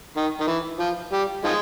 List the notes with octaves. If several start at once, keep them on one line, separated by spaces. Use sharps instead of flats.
D#3
D#3
E3
F3
G3
D#3 F3 G#3